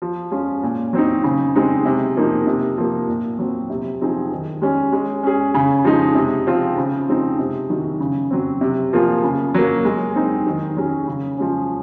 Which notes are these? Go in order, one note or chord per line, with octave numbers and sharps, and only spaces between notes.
F3
G#3 C#4 F4
A#2
F#3 C4 D#4
C#3
G#3 C4 D#4
C3
F3 A#3 D#4
C3
F3 A#3
A#2
F#3 C4
C3
F3 C4 D#4 G#4
D#3
G#3 C#4 G#4
G#3
C#4 G#4
C#3
F3 G#3 D#4
C3
F3 C4 F4 G#4
C#3
F3 G#3 C4 D#4
C3
D#3 F#3
C#3
F#3 C4
C3
F3 A#3 F4 G#4
C#3
F#3 A#3
G#3
C4 D#4
D#3
F#3 C#4 G#4
C#3
F3 G#3 C#4